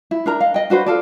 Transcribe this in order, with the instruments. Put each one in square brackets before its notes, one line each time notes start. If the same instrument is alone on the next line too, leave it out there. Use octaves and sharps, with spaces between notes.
[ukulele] E4
D4 A#4 A#5
D#5 F5
D#5 G5
D4 F#4 B4 C5
F4 A4 D5